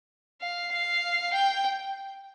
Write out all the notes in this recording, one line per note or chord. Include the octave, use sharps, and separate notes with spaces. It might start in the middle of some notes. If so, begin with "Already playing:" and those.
F5
F5
G5